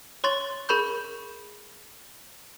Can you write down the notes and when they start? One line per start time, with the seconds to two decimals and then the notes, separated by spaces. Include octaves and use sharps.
0.24 C#5 C6 C#6 A6
0.69 G#4 A#4 B5 C#6 G6